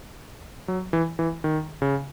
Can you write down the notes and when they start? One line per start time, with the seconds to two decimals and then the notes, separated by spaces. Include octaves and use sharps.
0.68 F#3
0.93 E3
1.19 E3
1.44 D#3
1.82 C#3